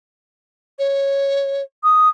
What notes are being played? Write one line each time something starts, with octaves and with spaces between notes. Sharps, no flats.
C#5
D#6